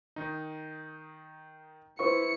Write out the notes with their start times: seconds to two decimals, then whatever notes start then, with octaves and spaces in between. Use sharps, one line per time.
0.16 D#3 D#4
1.99 E4 B4 C5 C#6 C#7